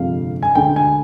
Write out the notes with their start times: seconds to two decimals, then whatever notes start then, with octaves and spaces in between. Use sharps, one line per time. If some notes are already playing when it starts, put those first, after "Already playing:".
Already playing: G1 F2 C3 F3 G#3 F5
0.43 G#5
0.55 D2 D3 G#3 G5
0.76 G#5